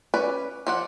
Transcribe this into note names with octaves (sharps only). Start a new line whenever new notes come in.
C#4 B4 D5
F3 D5 F#5